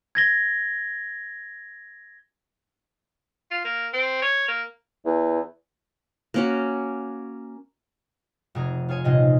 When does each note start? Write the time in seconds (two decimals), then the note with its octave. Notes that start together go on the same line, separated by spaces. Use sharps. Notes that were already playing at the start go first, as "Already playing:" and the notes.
0.15 G#6 A#6 G7
3.51 F4
3.65 A#3
3.93 C4
4.22 C#5
4.48 A#3
5.06 E2
6.34 A#3 C#4 F#4
8.55 F1 G#4 A#5
8.89 F4 G#4 C#5 G#5
9.04 D#1 C3 F4 D#5